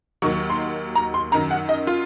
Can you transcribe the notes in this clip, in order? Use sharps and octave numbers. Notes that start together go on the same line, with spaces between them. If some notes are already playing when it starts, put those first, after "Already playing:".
D#2 D#3 F#3 C#6
C6
A#5
C6
F#2 D#3 F#3 A#5
F#5
D#5
F4